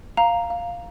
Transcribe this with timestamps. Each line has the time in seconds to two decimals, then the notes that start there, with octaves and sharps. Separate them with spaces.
0.17 F5 A#5
0.50 F5